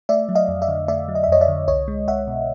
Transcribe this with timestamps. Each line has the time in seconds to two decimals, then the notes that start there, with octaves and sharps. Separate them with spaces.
0.09 A3 D5 E5
0.29 F#3
0.35 D#5 F5
0.48 F2
0.62 D5 E5
0.68 D3
0.88 A3 D5 E5
1.08 F#3
1.15 D#5
1.24 E5
1.28 F2 C#5 D#5
1.41 D5 E5
1.48 D3
1.68 C2 C#5 D#5
1.88 G#3
2.08 C2 E5 F#5
2.27 B2